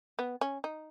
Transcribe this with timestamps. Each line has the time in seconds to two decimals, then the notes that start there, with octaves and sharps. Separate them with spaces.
0.19 B3
0.41 C#4
0.64 D#4